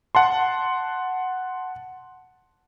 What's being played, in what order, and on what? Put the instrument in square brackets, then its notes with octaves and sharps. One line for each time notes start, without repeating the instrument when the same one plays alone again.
[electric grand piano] F#5 A5 C6